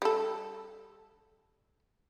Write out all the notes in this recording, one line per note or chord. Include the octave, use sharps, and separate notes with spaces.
G3 A4